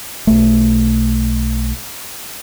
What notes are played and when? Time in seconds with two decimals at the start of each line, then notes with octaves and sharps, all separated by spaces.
0.27 B1 A3